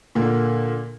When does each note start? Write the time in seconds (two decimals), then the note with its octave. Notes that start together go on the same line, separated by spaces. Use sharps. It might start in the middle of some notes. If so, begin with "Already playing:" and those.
0.15 A#2 D3 A#3